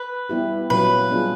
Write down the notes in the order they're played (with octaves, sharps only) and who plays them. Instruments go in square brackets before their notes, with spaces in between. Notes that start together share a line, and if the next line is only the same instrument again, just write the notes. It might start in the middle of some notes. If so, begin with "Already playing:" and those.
Already playing: [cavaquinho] B4
[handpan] G3 B3 E4 G4
[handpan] A#2 F#3 A#3 C#4 [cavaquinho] B4
[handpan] G3 B3 D4 F4 G#4